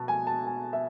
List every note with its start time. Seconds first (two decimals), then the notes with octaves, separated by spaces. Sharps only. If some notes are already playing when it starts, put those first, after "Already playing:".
Already playing: B2 A5
0.08 G#5
0.27 A5
0.46 G#5
0.73 E5